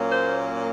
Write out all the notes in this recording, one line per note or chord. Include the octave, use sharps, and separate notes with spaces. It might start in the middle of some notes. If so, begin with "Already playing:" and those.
Already playing: A#2 F#3 A#3 C#4
C5